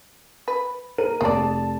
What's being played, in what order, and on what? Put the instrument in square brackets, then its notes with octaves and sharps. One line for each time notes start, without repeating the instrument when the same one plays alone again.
[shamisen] B4
[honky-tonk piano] A#4 D#7
[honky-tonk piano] F1 A5 [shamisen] G#3 D5